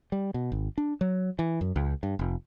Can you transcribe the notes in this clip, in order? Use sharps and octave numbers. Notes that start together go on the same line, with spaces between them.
G3
B2
G#1
D4
F#3
E3
F#2
C#2
G2
F1